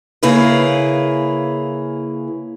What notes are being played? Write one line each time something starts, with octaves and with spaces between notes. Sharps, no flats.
C#3 A#3 E4 G#4 B4